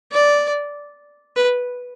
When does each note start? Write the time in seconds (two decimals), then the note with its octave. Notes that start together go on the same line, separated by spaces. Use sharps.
0.12 D5
1.36 B4